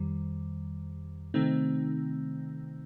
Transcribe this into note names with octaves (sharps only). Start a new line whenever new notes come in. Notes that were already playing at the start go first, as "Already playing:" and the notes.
Already playing: F2 D#3 G3
C3 D#3 A3 C4 D#4